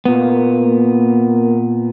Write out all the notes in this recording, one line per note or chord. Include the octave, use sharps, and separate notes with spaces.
A#2 A#3 B3